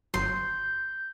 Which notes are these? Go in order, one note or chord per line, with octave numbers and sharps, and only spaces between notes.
G1 F#3 C6 G6